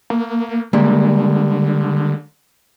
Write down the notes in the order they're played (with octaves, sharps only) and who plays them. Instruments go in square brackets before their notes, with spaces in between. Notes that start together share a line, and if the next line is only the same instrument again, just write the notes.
[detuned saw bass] A#3
[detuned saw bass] D3 [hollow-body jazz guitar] G3 G#3 A#3